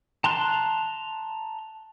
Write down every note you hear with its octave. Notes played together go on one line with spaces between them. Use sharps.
A5 A#5 C6 F#6